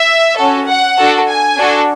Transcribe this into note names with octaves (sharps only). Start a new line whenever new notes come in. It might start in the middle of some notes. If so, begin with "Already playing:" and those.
Already playing: E5
C#4 F#4 A4
F#5
D4 F#4 A4
G#5
D4 F#4 A4